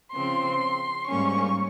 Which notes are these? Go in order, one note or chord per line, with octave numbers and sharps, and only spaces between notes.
C#3 F3 C4 C6
G#2 G3 A#3 C#4 C#6